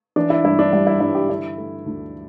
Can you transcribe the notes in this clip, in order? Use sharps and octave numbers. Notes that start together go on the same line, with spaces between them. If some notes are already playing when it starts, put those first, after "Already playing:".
E3 D4
E4
G2 E4
D4
G3 E4
E4
G2 E4
G4
D3 E4
A3
D2